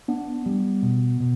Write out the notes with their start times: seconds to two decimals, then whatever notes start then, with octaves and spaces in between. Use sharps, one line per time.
0.08 B3 D4
0.46 G3
0.83 B2
1.20 B2